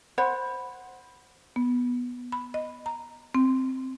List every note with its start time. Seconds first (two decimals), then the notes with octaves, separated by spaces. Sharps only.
0.18 C5 F#5 B5
1.56 B3
2.32 B5
2.54 D#5
2.86 A#5
3.35 C4